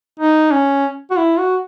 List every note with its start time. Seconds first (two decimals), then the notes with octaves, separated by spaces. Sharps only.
0.19 D#4
0.52 C#4
1.10 F#4
1.17 E4
1.39 F#4